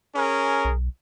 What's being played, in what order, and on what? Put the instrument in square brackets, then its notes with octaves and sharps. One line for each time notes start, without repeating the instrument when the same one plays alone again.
[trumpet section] C#4 G#4 A#4
[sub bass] B1